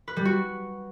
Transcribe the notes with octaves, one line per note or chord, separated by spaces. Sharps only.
B4
G3
F#4